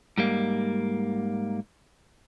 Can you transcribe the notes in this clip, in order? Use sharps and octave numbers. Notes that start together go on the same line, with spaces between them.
G#2 G3 A#3